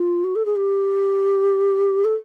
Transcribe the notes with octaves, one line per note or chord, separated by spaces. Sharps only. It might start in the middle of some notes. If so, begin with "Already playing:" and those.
Already playing: F4
F#4
A4
G#4
G4
A4